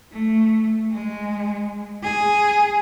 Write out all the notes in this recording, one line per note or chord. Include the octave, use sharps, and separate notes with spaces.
A3
G#3
G#4